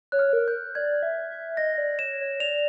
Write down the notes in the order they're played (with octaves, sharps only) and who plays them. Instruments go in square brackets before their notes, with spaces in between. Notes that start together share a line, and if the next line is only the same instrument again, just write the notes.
[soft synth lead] C#5 [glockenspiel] F#6
[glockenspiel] F6
[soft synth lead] A#4
[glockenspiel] G6
[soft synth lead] D5 [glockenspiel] G#6
[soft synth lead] E5
E5
[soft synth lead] D#5 [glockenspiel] A#6
[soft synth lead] D5
[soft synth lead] C#5 [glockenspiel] E7
[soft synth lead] C#5
[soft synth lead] D5 [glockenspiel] F7